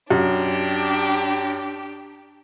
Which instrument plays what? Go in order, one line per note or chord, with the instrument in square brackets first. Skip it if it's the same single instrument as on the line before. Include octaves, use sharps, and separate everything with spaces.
[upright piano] F#2 [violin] D4 G4